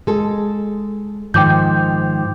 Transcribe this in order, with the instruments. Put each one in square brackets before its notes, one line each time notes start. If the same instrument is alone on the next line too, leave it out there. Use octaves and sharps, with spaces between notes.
[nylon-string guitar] G#3 A4
[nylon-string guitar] G#2 D#3 F3 [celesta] G5 D6 G6